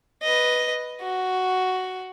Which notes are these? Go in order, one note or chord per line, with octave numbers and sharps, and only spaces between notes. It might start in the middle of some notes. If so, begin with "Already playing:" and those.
B4 D#5
F#4